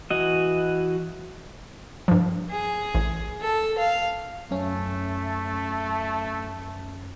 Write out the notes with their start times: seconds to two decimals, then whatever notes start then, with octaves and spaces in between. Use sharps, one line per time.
0.11 E3 F#4 D#5
2.08 G2 F3
2.50 G#4
2.95 A1
3.41 A4
3.78 F5
4.51 F#2 A3 C#4